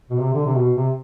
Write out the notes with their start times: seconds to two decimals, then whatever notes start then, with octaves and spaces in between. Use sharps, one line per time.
0.10 B2
0.21 C3
0.33 D3
0.46 C3
0.57 B2
0.76 C3